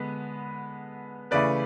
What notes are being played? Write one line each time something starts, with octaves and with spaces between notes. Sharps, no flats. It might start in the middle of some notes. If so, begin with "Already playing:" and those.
Already playing: D3 G#3 B3
C#3 E3 A3 B4 D5